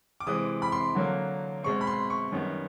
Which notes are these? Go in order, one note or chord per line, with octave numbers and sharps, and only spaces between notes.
D6
C3 E3 G#3 C4 D#6
B5
C6
D3 F#3 A#3
B2 G#3 C4 C#6
B5
C6
C#6
F#2 D#3 G3 B3